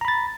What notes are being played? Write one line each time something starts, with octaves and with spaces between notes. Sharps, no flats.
A#5 B5 A6